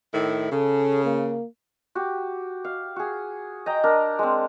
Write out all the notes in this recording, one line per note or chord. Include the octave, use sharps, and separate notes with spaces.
A2 D#3 E4
C#3 A4
A#3
F#4 G4
F5
F#4 G#4
D#5 G5 A#5
D4 A#4
G#3 C4